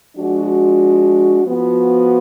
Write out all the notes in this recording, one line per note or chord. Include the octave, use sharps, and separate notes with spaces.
F3 G#3 D4 F#4
F3 B3 F#4